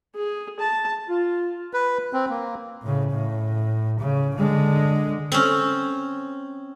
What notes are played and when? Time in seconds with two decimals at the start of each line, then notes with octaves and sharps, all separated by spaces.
0.15 G#4
0.59 A5
1.09 F4
1.74 B4
2.13 C4
2.29 A#3
2.83 A2 C#3
3.11 A2
3.99 C#3
4.36 D3 G#3
5.32 C4 C#4